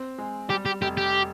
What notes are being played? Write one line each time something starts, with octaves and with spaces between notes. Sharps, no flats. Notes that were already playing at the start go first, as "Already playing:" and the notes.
Already playing: C4
G#3
G3 G4
G4
F1 G4
G4